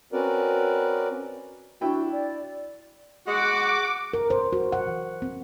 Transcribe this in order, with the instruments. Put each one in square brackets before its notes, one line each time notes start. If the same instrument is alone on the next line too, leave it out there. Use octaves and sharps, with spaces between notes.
[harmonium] C4 C#4 F#4 A#4 B4 D5
[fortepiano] D4 E4 G5 [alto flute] F#4
[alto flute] D5
[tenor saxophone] G#3 [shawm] F#4 [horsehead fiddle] F#5 [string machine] D6
[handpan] A#4
C5
F#4
F#5
E3
C4